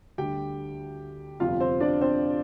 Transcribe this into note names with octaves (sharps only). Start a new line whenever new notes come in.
D2 D3 G3 G4 G5
G1 F2 C3 G3 F4 F5
C4 C5
D4 D5
C4 C5